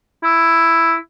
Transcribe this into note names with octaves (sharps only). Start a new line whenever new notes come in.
E4